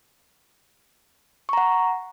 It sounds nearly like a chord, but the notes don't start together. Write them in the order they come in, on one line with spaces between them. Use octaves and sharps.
C#6 A#5 F#5